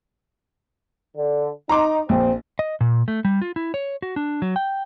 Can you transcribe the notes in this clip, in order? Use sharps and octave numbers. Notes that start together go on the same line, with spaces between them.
D3
D#4 A#5 C6 D6
A#1 C4
D#5
A#2
A3
G3
F4
E4
C#5
F#4
D4
F#3
G5